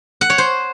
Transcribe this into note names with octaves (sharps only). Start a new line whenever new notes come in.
F#5
C#5
C5